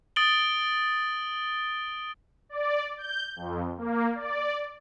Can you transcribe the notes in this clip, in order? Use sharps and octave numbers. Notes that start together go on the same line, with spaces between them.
D#6 A6 D7 F#7 G7
D5
G6
F2
A#3
D5